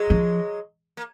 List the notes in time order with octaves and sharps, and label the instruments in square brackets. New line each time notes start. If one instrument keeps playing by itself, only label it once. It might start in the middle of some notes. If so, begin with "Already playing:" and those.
Already playing: [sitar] F#3 G#3
[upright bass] F3
[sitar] A#3